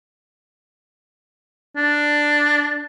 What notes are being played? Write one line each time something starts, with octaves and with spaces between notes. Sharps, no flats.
D4